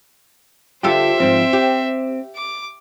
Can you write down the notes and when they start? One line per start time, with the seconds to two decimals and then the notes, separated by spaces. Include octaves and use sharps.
0.83 D3 F4 G4 A4 C5 E5
1.20 G#2 F3 C4
1.53 G4
2.36 D6